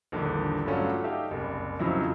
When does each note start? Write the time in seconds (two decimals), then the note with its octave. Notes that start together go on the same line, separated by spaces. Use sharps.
0.12 A#1 E2 D3 D#3 G3
0.66 G2 F#3 A3 C#4 F4 F#4
1.04 D#4 G4 A4 E5 F5
1.31 F#1 C2
1.79 F2 C#3 F3 F#3 D#4 E4